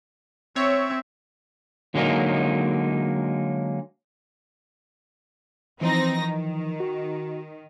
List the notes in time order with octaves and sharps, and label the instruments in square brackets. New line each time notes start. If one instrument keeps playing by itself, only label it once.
[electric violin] C4 E5 [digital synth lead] C#5
[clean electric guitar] D3 F#3 G#3 A#3 D#4
[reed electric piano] E3 F3 [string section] C4 D#4 A#6
[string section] D#3
[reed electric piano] F#4